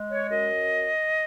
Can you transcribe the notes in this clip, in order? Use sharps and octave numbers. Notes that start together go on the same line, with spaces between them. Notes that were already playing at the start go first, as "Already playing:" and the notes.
Already playing: G#3
C#5
F#2 D#5